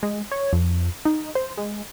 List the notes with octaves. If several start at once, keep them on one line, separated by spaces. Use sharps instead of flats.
G#3
C#5
F2
D#4
C5
G#3